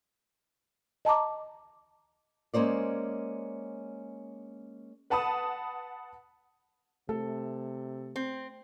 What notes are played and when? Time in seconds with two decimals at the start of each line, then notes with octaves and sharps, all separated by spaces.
1.05 D#5 A5 A#5 D6
2.54 G#3 A#3 C#4 C5 D5
5.10 B4 F#5 A5 B5 D#6
7.09 C3 A3 A4
8.16 C4